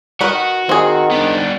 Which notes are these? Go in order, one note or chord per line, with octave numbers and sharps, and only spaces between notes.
D#3 F#4 B4 B5
D#3 C4 G#4
B3 D4